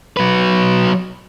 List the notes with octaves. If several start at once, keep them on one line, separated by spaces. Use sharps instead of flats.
F#3 B4